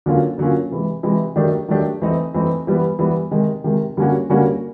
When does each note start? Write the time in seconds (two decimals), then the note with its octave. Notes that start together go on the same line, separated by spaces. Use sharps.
0.06 D3 F#3 A#3 C#4 F4
0.38 D3 F#3 A#3 C#4 F4
0.71 C3 E3 G#3
1.03 C3 E3 G#3
1.36 D#3 F#3 A3 D4 G4
1.68 D#3 F#3 A3 D4 G4
2.02 E3 A3 C4 D#4
2.34 E3 A3 C4 D#4
2.67 E3 G3 B3
2.99 E3 G3 B3
3.31 C3 D#3 G#3
3.64 C3 D#3 G#3
3.97 D3 G3 A#3 C#4 F#4
4.30 D3 G3 A#3 C#4 F#4